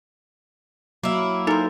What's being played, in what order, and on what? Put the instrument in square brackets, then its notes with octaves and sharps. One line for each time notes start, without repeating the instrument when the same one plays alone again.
[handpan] F#3 [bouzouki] A#3 E4
[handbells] D#4 [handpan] A4 [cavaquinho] A#4 C5